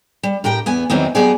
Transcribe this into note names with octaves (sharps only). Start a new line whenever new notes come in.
G3
A2 G4 A#4 G5
E2 B3 G#5
E2 D#3 E3 F#3 C4 D#4
F#3 A3 B3 G4 G#4 D5